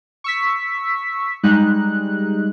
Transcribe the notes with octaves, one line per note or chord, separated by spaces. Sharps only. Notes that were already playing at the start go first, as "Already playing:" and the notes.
C#6 E6 B6
G3 G#3 D#4 F#6